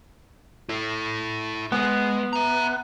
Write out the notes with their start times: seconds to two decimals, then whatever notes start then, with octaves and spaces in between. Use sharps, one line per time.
0.69 E4 A4
1.72 G#3 B3
2.33 E5 A#5